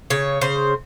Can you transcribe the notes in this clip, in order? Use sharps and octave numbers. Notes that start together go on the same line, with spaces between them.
C#3 C#5
C#3 C5